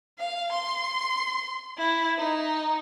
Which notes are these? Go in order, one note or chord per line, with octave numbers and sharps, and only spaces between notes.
F5
C6
E4
D#4